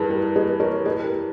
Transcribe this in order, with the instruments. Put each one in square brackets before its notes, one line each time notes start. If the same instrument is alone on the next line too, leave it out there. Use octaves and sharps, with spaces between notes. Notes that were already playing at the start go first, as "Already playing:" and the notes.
Already playing: [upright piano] G2 E3 [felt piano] G4 G#4 A#4 B4
[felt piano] G4 A#4
G#4 B4
A#4 C#5
G#4 B4
G4 A#4